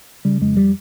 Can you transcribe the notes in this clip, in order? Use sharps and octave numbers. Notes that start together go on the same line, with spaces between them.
C#3 G3
F2 G#3
G3